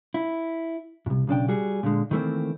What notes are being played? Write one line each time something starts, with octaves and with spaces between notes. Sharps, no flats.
E4
C2 F#2
B1 C#3 D4 G5
G3 F#4 G#4
A#2 D3 G#3
D#3 E3 A3 A#3 C4